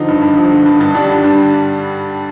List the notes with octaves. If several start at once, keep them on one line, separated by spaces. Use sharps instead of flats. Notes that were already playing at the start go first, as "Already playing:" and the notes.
Already playing: D3 F3 D#4
G2
G2
F3
D3
G2
G2
G3 D4
D3
G2